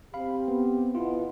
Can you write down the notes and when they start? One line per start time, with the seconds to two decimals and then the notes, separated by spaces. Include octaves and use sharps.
0.14 C4 G4 F5 B5
0.48 B3
0.95 B2 B3 E4 F4